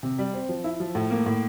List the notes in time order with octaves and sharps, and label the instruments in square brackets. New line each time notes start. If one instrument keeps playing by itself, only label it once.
[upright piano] C3
G3
C4
F3
E4
F3
A2
A#3
A2